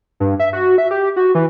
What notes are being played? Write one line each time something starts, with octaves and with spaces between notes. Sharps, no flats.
G2
E5
F#4
E5
G4
F#4
E3